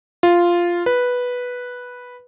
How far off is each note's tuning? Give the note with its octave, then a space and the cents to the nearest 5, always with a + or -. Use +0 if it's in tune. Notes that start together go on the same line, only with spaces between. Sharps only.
F4 -5
B4 -5